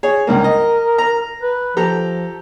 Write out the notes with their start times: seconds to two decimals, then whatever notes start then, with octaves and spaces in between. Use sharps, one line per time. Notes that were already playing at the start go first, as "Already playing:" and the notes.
0.03 G#4 C#5
0.27 C#2 G2 A#3 A#4
0.44 D#5
0.98 A#5
1.42 B4
1.77 F3 G4 A4 A#5